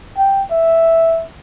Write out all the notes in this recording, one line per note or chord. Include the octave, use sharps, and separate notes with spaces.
G5
E5